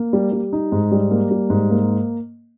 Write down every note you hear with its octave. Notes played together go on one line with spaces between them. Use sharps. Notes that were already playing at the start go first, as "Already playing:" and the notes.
Already playing: A#3
G3
G3
D#4
G#2
G3
A#3
G3
G#2
A#3